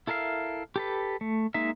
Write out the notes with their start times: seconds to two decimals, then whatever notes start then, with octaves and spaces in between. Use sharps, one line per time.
0.07 E4 A4 A#4 E5 F5
0.76 G4 A4 B4
1.21 A3
1.54 G#3 A#3 D#4 E5